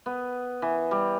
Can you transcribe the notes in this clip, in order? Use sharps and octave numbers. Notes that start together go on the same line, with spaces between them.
B3
E3
G3